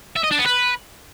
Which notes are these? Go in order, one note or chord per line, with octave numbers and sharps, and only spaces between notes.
E5
D#5
D4
B3
B4